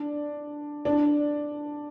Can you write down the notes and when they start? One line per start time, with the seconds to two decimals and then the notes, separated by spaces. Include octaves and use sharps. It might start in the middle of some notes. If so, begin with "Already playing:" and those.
Already playing: D4
0.85 D4